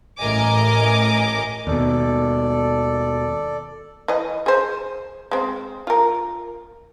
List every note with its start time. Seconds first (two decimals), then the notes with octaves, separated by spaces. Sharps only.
0.19 A1 A2 A#4 D#5 G#5 D6
1.67 D#2 B2 A4 D5
4.08 E3 D#5
4.46 G#4 C5
5.31 G#3 C4
5.87 F4 A#4